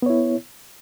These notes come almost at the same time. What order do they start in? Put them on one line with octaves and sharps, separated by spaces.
B3 C#5 E4